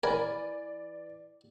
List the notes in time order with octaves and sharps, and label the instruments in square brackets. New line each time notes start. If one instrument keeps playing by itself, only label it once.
[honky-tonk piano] E3 D5 [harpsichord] A#4 [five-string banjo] B4 G#5